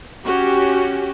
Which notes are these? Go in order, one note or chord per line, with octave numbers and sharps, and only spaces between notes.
C#4 F#4 G4